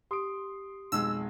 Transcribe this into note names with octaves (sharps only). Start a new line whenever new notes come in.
G4 C6 D#6 D7
B1 F2 G#3 E6